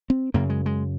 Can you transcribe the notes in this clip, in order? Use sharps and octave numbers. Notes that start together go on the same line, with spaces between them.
C4
F#2 C#3 A#3
G#3
G#3